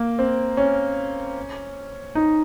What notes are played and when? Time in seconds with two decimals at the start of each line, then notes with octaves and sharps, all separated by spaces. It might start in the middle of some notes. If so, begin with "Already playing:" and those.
Already playing: A#3
0.19 C4
0.57 C#4
2.15 D#4